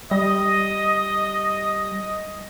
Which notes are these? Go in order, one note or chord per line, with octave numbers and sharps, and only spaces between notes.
G3 D#5